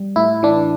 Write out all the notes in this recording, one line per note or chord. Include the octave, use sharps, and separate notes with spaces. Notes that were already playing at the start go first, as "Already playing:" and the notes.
Already playing: G3
A2 E4
E3 D4